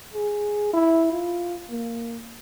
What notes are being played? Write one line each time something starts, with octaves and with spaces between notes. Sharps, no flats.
G#4
E4
F4
A#3